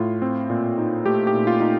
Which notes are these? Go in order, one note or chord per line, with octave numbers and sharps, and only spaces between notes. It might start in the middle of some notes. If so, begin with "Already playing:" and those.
Already playing: A2 F4
C4
A#2
D#4
A3 G4
G4
A#2
F4
D#4 F4